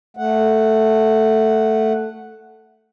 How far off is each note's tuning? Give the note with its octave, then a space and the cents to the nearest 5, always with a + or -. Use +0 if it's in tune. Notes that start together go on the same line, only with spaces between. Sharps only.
A3 +0 F#5 +0